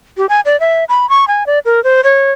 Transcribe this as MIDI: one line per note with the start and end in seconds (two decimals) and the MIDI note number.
0.17 0.26 67
0.29 0.40 80
0.45 0.59 74
0.60 0.84 76
0.89 1.09 83
1.09 1.28 85
1.28 1.46 80
1.46 1.59 74
1.65 1.83 70
1.84 2.01 72
2.04 2.32 73